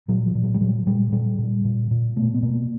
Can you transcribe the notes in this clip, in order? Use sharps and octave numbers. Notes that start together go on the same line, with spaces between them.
A#2 F#3
F3
A#2
F#3
G3
A#2 F#3
A#2 G3
A#2 G3
A#2
A#2
A#2
B2 A3
B3
B2 A#3